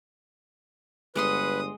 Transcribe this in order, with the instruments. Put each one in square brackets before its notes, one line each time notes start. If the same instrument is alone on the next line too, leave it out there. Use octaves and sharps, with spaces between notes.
[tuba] G1 [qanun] G#3 F#5 C6 [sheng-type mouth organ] B4 [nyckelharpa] D#6